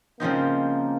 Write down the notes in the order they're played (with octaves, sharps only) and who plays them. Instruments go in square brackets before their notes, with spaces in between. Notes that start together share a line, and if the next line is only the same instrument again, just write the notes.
[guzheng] C#3 F3 C4 D#4 [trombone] A#3